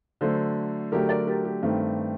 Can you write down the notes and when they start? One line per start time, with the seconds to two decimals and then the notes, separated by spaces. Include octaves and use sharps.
0.21 D3 F#3 A3 A4 C5
0.92 D3 F#3 A3 G4 A#4
1.09 A#4 D5
1.27 G4 A#4
1.45 G4
1.62 G2 D#3 A3 C4